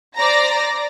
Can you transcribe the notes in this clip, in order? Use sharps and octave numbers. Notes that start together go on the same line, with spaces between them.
C5 D5 A#5 A#6